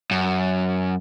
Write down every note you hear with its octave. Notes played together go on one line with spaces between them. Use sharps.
F#2